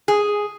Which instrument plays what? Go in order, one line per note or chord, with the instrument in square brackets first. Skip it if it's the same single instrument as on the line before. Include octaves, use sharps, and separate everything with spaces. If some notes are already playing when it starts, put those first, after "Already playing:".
[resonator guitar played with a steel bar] G#4